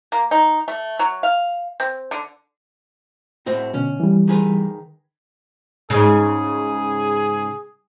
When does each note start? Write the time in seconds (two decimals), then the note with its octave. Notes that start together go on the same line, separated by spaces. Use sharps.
0.12 A#3
0.31 D#4
0.68 A3
0.99 F#3
1.23 F5
1.80 C4
2.11 D3
3.46 A2 C4 F#4
3.74 B2 D3 C#4
4.00 E3 G3
4.28 D#3 G#4 B4
5.90 G#2 C#3 G#4